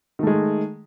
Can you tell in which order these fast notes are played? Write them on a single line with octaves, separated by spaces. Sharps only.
D#3 A3 G#3